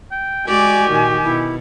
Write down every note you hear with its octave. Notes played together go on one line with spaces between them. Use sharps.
G5
G#3 F#4 G4 D5 G#5
A#2 D#3
B2 E4